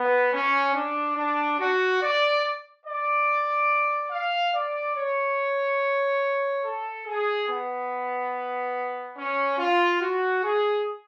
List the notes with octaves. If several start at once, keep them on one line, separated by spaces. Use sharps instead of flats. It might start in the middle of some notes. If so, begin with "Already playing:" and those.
Already playing: B3
C#4
D4
D4
F#4
D5
D5
F5
D5
C#5
A4
G#4
B3
C#4
F4
F#4
G#4